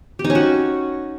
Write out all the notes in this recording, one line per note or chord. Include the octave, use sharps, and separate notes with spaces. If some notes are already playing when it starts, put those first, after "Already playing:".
G4
D#4
C#4
F#4